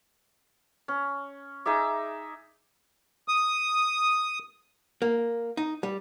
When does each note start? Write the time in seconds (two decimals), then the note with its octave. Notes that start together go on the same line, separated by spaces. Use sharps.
0.88 C#4
1.66 D#4 G#4 E5 D6
3.28 D#6
5.02 A#3
5.57 D#4
5.83 G3